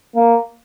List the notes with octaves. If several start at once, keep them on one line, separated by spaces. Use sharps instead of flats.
A#3